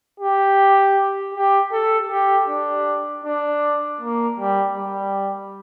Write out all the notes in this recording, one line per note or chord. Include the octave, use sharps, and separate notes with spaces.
G4
G4
A4
G4
D4
D4
A#3
G3
G3